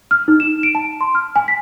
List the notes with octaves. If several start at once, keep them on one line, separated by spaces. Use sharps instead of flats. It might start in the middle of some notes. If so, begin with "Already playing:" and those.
F6
D#4
E7
D7
A5
C6
F6
G#5
B6